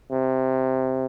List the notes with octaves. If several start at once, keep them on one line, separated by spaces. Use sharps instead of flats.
C3